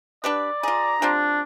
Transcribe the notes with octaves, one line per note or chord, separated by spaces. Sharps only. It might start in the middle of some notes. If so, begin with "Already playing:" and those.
D4 G4 B4 D5
F4 G#4 A#5
G3 C4 D4 F4